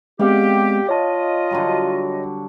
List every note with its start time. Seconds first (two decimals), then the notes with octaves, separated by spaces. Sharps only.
0.19 G#3 B3 C4 G4 D5 F5 F#5
0.89 F4 C#5 D#5 A5
1.51 D3 F#3 G3